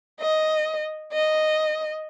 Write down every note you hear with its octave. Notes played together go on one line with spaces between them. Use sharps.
D#5
D#5